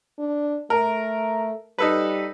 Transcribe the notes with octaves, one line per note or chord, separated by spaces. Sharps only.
D4
A3 A#4
G3 D#4 A4 B4